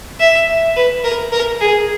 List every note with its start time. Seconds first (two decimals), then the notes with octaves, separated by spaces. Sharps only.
0.20 E5
0.76 B4
1.04 A#4
1.32 A#4
1.61 G#4